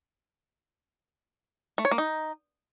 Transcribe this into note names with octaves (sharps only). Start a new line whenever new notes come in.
A3
C#5
A#3
D#4